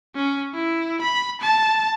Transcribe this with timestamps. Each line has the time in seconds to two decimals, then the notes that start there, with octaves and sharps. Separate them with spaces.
0.16 C#4
0.54 E4
1.02 B5
1.41 A5